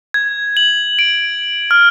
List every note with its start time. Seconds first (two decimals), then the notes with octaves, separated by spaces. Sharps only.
0.14 G#6
0.57 F#7
0.99 D7
1.71 F6